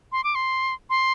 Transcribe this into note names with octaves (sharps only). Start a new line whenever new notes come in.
C6
D6
C6
C6